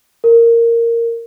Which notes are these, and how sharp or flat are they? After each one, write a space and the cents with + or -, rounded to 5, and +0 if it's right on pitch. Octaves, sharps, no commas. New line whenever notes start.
A#4 -10